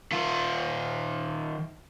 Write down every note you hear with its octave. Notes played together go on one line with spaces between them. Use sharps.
D#3 F4